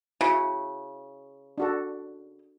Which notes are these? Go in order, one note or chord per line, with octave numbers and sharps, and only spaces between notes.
C#3 E4 F#4
D4 F#4 A4